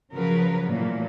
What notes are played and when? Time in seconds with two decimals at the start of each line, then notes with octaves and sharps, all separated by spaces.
0.13 C#3 F3 F#3 A#4 B4
0.68 A#2 E3 F#3 A3 A#3